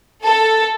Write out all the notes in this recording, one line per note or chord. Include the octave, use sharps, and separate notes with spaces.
A4